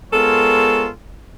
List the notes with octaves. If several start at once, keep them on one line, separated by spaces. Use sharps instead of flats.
G#3 B3 F4 A4 A#4 C#5